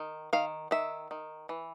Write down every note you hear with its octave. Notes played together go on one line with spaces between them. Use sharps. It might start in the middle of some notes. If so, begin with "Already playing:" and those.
Already playing: D#3
D#3 F5
D#3 E5
D#3
E3